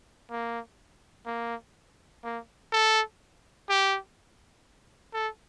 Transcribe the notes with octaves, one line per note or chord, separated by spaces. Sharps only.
A#3
A#3
A#3
A4
G4
A4